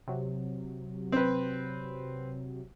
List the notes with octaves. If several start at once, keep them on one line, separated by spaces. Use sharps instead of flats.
C3 F#3
C4 B4